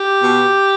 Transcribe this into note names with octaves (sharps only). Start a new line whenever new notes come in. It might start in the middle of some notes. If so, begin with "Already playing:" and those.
Already playing: G4
B2